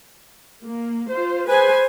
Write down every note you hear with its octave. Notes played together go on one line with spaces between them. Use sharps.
A#3
F4 C5
G#4 B4 C5 G#5